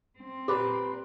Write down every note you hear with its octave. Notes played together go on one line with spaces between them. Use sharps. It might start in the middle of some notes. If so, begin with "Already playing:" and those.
C4
A#2 G4 B4